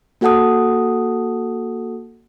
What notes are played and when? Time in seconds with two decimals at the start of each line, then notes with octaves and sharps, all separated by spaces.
0.21 A#3 F#4 A4 F#5 A5 D#6